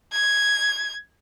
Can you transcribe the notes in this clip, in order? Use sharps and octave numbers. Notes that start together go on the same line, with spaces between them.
G#6